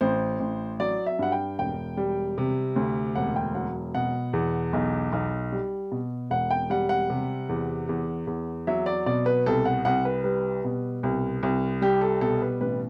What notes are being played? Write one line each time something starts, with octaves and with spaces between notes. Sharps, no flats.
A1 C5
A1
F#3 D5
E5
G2 F#5
G5
E1 G5
G3
C3
D2
E1 F#5
G5
F#3 F#5
B2 F#5
E2
B1
B1
G3
B2
E1 F#5
G5
G3 F#5
F#5
C3
E2
E2
E2
F#3 E5
D5
B2 D5
B4
C2 A4
F#5
C2 F#5
B4
G3 B4
B2
C2
C2
G3 G4
A4
B2 A4
B4
A1 B4